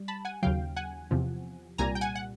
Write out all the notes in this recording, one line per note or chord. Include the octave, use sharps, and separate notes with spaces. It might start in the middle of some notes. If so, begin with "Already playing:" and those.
Already playing: G3
A5 B5
F#5 G#5
D#2 C#3 F#3 F5 G5
F#5 G#5
E2 C3 F3
C2 A#2 G3 G#5 A#5
G5
F#5 G#5
F#5